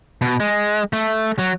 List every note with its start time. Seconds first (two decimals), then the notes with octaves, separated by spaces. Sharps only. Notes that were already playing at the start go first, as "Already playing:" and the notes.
0.22 B2
0.40 G#3
0.93 A3
1.39 F#3